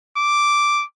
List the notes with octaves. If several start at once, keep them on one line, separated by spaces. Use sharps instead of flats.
D6